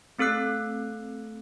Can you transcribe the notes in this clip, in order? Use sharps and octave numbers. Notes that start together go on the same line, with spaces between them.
A3 C4 A4 E6 F#6 C7